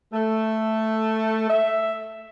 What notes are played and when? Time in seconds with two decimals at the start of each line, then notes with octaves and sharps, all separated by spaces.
0.13 A3
1.49 E5